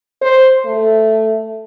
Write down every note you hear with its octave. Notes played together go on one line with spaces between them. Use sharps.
C5
A3